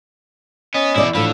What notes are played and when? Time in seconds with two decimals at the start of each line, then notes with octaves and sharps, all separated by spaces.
0.74 B3 C#4 D#5
0.96 E2 B2 E4 D5
1.15 A2 D3 E3 F3 B5